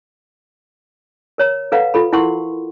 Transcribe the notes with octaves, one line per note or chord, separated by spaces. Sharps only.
A#4 C#5 A#5
A4 B4 F5 F#5 A#5
F4 A4 B5
E4 A#4 F#5 C6 C#6